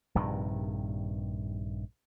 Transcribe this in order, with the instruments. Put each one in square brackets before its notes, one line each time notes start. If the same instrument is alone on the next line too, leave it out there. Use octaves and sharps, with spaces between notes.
[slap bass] A#1 G2 C3 D#3